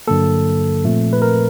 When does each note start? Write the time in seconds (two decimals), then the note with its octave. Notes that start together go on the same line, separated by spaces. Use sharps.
0.07 G2 D3 F#3 A#3 A4
0.84 A#2 F3 A3 C4
1.13 B4
1.22 A#4